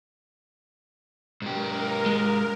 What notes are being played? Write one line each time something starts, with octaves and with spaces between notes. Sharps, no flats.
G#2 G4 A#4
G#3